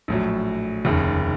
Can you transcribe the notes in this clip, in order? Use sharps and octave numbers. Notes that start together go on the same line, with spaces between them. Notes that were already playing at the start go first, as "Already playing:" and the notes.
A#1 A2 F#3
F1 D#2 C#3